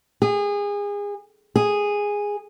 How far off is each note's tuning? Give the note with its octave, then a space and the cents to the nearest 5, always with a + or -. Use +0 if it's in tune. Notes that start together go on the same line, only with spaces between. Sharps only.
G#4 -30
G#4 -10